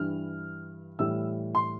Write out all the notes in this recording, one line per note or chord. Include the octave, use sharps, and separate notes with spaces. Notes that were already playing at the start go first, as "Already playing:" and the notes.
Already playing: G2 E3 G3 F6
A2 E3 G3 E6
C6